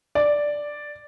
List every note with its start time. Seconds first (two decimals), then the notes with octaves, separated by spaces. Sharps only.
0.15 D5